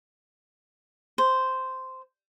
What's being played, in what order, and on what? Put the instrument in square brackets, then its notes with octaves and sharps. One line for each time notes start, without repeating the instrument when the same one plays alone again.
[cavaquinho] C5